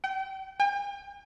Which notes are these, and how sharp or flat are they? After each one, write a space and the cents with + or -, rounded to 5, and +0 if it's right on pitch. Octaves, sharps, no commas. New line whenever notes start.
G5 -35
G5 +45